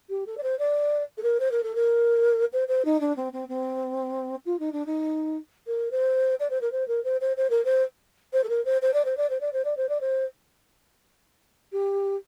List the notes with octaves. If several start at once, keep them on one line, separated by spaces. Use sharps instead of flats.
G4
A4
D5
C5
D5
A4
A#4
C5
A#4
A4
A#4
C5
C5
D#4
D4
C4
C4
C4
F4
D#4
D4
D#4
A#4
C5
D5
C5
A#4
C5
A#4
C5
C5
C5
A#4
C5
C5
A4
A#4
C5
C5
D5
C5
D5
C5
D5
C5
D5
C5
D5
C5
G4